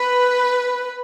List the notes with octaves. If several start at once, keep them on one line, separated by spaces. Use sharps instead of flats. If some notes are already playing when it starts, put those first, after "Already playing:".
Already playing: B4